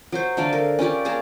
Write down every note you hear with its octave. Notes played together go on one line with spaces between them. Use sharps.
F#3 F#4 C5
D3 A3 D5 F5
A#4
C#4 F4 G4 D5
A#3 G#4 A5 A#5